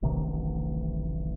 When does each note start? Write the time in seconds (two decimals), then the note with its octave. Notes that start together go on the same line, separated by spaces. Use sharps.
0.02 D1 A1 C3 D#3